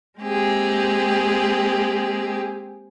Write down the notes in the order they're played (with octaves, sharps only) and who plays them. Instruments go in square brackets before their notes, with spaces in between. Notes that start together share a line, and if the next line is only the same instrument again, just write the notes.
[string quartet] G#3 A#3 C4 G4 G#4